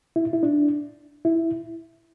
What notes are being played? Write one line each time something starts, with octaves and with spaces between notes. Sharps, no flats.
E4
E4
D4
E4